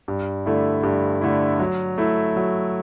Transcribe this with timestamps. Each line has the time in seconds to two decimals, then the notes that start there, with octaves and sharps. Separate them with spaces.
0.08 G2
0.46 D3 A3 E4
0.83 G2
1.21 D3 A3 E4
1.59 F#3
1.98 A3 E4
2.36 F#3